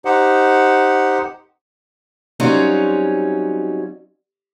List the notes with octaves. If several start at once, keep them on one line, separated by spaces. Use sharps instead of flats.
D#4 G4 C5 F#5
F#3 G3 C4 C#4 D#4 F4